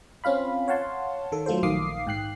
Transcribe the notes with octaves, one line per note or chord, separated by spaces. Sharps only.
C4 C#4 F4 F5 B5
C#5 F5 F#5 A5 C6
D#3 A4
F#3 A3 F4 A4 C5
A#1 D#3 F5 D6 D#6 C7
G#2 G5 F#6 C7